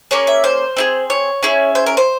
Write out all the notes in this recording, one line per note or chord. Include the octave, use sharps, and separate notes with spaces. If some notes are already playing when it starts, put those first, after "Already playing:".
A#3 C#4 G#4 C#5
E5
C5
C4 E4 G#4
C#5
C#4 E4 G#4
C5
A#4
C5